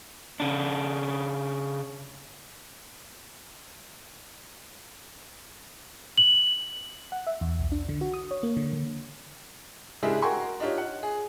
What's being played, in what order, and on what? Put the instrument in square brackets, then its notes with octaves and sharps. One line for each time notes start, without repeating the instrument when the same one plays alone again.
[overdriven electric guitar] C#3 D4
[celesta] F#7
[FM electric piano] F#5
E5
E2
B1
D4
D3
F#4
D#6
C#5
A#3
D3
D3
[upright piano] C#3 G#3 D4 E4 G4 G#4
F#4 A#4 G5 G#5 C6 C#6
D4 D#4 F4 G4 C#5
F#5
G#4